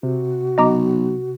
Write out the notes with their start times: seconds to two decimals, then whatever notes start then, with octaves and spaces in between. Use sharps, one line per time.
0.03 C3 F#4
0.58 B1 D#5 A#5 D6